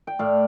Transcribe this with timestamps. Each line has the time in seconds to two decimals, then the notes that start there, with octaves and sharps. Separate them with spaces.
0.07 G5
0.19 A2 D5 F5